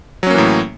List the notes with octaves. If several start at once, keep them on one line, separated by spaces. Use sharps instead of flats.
A2 E3 F#3 A#3 C#4